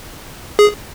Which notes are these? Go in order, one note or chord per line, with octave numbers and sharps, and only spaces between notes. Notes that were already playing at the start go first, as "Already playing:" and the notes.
G#4